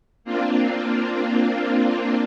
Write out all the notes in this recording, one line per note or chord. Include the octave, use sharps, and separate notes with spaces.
A#3 C4 D4 F4